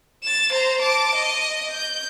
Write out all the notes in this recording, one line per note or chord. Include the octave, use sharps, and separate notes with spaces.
A6 E7
C5 A#5
A5 D6
D#5
G6